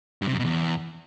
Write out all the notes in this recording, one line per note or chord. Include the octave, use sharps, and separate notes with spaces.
G2
C3
F#2
B2
E2